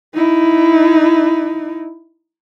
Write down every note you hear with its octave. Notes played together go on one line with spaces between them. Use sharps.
D#4 E4